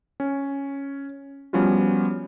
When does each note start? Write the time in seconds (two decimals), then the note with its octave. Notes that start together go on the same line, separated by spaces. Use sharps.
0.20 C#4
1.53 F3 G3 B3 C#4 F4 F#4